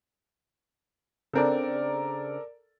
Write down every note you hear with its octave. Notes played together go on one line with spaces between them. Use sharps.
C#3 C4 D4 A4 A#4 D5